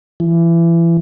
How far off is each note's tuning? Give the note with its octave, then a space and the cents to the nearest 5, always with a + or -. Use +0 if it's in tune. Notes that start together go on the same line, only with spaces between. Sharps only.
E3 +30